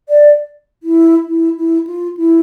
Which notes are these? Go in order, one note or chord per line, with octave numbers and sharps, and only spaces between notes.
D5
E4
E4
E4
F4
E4